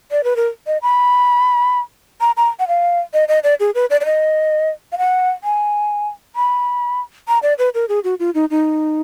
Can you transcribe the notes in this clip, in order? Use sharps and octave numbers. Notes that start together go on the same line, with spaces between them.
D5
B4
A#4
D#5
B5
A#5
A#5
F#5
F5
D#5
D#5
D5
G#4
B4
D5
D5
D#5
F5
F#5
G#5
B5
A#5
D5
B4
A#4
G#4
F#4
F4
D#4
D#4